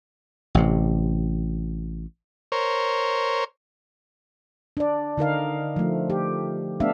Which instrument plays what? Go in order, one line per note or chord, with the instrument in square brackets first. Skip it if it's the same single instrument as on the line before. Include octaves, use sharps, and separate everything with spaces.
[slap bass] A1 C3
[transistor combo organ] A#4 C5 C#5
[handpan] D4 D5
D3 D#4 A#4 F5
F3 A3
G4
A3 B3 D4 E5 F5